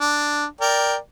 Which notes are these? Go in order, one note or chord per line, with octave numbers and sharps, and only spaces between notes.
D4
A#4 D5 G5